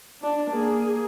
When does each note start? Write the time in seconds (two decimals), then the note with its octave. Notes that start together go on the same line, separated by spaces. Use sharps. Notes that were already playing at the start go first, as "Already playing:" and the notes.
0.22 D4
0.51 A#3 G#4